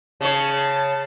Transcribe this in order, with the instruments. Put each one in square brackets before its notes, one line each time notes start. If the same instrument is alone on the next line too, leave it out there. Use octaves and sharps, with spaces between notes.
[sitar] C#3 C#5 [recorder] A5